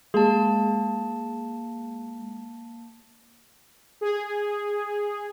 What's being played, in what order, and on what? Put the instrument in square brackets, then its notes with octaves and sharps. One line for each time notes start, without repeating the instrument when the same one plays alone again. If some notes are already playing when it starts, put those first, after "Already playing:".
[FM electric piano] G#3 [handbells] A#3 A5
[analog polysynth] G#4